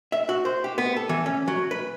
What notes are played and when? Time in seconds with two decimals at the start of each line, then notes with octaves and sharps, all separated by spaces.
0.12 E5
0.29 F#4
0.45 C5
0.64 G4
0.78 B3
0.96 A4
1.09 E3
1.26 C#4
1.48 F#3
1.71 B4